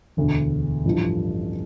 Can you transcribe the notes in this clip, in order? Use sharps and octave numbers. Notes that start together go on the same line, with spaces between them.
E1 D2 D3
A1 G2 F3